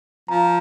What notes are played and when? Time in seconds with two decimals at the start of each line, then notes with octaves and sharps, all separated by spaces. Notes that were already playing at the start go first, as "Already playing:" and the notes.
0.28 F3 A#5